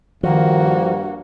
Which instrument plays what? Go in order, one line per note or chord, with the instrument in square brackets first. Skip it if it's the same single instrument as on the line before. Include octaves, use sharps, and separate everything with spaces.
[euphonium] G2 [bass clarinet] D#3 [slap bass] F3 [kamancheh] A#3 F#4